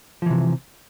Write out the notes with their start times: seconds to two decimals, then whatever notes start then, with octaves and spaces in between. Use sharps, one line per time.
0.22 F3
0.26 E3
0.30 C3